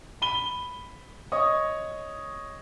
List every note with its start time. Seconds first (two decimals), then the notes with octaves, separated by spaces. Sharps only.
0.22 B5 D#7 G7
1.32 C#5 D#5 C#6 D#6